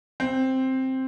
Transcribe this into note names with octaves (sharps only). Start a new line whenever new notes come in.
C4